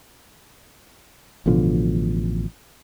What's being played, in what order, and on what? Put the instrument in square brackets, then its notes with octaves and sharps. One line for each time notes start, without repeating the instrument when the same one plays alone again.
[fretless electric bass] A1 B2 D3 F3